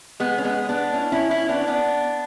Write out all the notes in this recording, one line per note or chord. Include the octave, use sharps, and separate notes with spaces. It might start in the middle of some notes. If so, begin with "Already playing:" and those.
G#3 B3
C#4
G#3 B3
B3 D4
C#4 E4
C#4 E4
C#4 E4
B3 D4
C#4
B3 D4